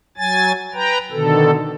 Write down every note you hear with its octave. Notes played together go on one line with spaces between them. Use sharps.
F#3 G#5 A6
B4 G5 A#5
B2 D3 D#3 A4